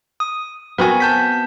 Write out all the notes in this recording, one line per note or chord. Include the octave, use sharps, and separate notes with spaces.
D#6
B3 C4 F#4 A#4 G#5
A5 G6 B6